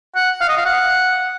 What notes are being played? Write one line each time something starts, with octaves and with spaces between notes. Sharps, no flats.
F#5
F5
D#5
F5
F#5